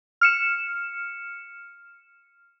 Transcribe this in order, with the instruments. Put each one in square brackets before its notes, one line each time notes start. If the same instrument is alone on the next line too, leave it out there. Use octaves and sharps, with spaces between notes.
[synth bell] F6 C#7 E7